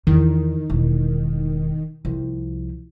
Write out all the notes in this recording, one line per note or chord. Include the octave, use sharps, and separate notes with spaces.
E2 D3 D#3
E1
C2 F3